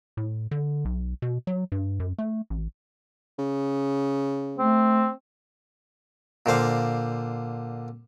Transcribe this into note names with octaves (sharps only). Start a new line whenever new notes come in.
A2
D3
B1
B2
F#3
G2
F#2
A3
A1
C#3
A3 C4
A#2 D3 C5 F5